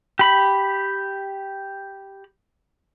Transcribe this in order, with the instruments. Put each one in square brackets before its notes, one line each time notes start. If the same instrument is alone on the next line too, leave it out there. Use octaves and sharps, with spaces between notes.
[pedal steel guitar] G4 B5